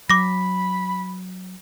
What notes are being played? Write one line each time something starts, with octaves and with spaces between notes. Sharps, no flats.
F#3 B5 D6 A#6